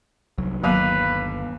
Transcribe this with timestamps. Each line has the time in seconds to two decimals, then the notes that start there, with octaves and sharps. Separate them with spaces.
0.38 C2 F#3
0.64 G1 D#2 F#3 B3 B4 F5